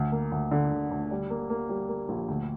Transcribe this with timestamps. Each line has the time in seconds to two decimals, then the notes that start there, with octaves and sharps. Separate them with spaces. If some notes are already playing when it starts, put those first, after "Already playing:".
Already playing: D2
0.12 A#3
0.32 D2
0.51 D3
0.71 D2
0.91 D2
1.11 G3
1.30 A#3
1.50 A#3
1.69 G3
1.89 A#3
2.09 A#1
2.28 D2